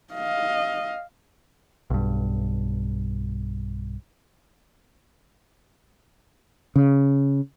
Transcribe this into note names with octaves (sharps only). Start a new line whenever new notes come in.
D#5 F5
B1 G2
C#3